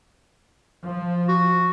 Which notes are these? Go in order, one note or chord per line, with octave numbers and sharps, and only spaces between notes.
F3
F#4